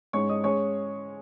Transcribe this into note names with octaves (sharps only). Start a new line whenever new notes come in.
G#2 G#3 C#4 C#5 C#6
D#5 D#6
G#3 C#4 C#5 C#6